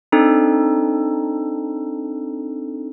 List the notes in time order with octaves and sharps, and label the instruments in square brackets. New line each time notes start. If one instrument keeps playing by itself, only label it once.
[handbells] C4 D4 D#4 A4